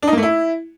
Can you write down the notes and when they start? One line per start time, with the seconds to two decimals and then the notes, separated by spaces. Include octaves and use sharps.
0.02 D4
0.07 D#4
0.13 A#3
0.18 A3
0.23 E4